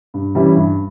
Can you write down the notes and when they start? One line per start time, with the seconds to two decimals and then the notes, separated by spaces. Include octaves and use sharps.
0.14 G2
0.35 E3 G3 C#4 E4
0.56 G2